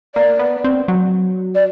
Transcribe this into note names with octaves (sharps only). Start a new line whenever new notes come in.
A#3 D5
B3
C4
F#3
D5